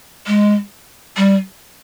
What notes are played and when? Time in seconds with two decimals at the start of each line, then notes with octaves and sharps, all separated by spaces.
0.27 G#3
1.17 G3